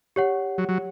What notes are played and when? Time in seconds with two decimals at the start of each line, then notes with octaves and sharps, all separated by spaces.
0.16 G4 C#5 F#5
0.58 F#3
0.69 F#3